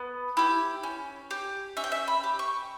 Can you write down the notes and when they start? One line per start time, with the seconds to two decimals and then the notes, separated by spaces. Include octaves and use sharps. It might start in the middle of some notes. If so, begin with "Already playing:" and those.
Already playing: B3
0.37 E4 G4
0.83 C#4
1.31 G4
1.77 C#4 E5
1.84 G5
1.92 E5
2.08 B5
2.24 G4
2.39 C#6